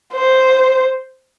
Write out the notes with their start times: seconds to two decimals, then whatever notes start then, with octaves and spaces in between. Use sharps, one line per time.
0.13 C5